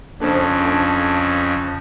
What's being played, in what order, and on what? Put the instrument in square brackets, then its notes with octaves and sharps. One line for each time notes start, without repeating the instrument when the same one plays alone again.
[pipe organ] F2 C#3 [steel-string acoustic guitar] D4 A4 C5
[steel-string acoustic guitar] A5